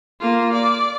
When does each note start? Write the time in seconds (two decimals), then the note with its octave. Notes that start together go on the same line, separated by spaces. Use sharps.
0.20 A#3 F4
0.53 D5